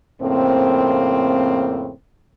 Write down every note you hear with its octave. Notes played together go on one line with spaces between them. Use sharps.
F2 A2 C#3 A#3 C4